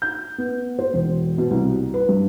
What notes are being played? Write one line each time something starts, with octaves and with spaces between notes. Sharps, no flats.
G6
B3
C5
E1
B2
C2
B4
G2